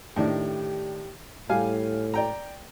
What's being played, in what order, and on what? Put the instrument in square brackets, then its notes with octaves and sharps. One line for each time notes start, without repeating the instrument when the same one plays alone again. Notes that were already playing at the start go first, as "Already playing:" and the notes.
[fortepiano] A2 D#3 D4 [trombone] G4
[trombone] A2 [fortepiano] G3 F5 G#5
[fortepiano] D5 G5 A#5